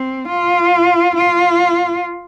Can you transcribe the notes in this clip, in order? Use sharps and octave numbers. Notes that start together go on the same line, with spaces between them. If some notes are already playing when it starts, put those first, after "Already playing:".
Already playing: C4
F4
F4